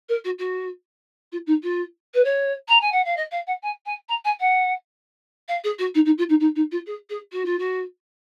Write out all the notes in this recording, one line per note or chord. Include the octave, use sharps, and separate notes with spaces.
A#4
F#4
F#4
F4
D#4
F4
B4
C#5
A#5
G#5
F#5
F5
D#5
F5
F#5
G#5
G#5
A#5
G#5
F#5
F5
G#4
F#4
D#4
D#4
F4
D#4
D#4
D#4
F4
G#4
G#4
F#4
F4
F#4